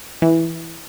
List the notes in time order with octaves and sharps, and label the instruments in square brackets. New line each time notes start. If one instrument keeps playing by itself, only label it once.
[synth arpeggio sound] E3